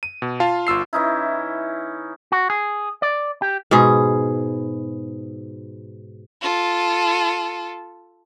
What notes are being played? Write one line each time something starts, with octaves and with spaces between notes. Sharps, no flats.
D#7
B2
F4 F5 A5
G1 F4 E6 C7
E3 C#4 D#4 E4
F#4
G#4
D5
G4
G#2 B2 G#4
F4 A4